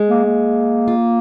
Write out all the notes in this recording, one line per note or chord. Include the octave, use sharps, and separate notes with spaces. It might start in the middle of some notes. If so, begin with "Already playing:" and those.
Already playing: G#3
A#3
A#3
F4